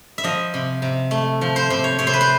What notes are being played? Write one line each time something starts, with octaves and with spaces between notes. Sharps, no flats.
E5
F3 D#5
C3
C3
A3
F3
C5
C3 C5
C#5
C3 C#5
C5
B4
C5